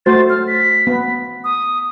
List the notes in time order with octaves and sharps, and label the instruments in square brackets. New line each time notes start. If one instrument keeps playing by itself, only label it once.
[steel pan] A3 F#4 C5 [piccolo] A6
[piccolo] F6
B6
[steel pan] B3
[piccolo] D#6